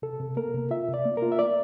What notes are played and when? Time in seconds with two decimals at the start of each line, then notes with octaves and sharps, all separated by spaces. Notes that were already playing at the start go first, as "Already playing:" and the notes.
0.02 C3 A4
0.20 C3
0.37 A#3 A#4
0.54 C3
0.71 F4 E5
0.89 C3 D5
1.05 A#3
1.17 A#4
1.22 F4
1.32 E5
1.39 A#3 D5